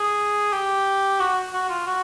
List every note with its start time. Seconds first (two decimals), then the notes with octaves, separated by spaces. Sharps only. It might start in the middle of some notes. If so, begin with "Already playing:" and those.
Already playing: G#4
0.53 G4
1.20 F#4
1.53 F#4
1.69 F4
1.87 F#4